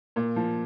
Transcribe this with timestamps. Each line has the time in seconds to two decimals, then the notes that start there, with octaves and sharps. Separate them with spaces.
0.16 A#2
0.36 F3